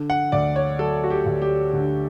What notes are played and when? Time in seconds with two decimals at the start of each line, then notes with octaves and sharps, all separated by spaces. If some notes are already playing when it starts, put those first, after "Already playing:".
Already playing: D3
0.10 F#5
0.32 D2 D5
0.56 C#5
0.79 F#3 A4
1.04 F#4
1.10 G4
1.26 D2
1.42 G4
1.73 D3